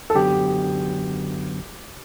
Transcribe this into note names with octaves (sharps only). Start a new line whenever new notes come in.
A4
F#2 D3 F#3 B3 G4